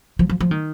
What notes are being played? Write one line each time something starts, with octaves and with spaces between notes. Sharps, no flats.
F3
F3
F3
D#3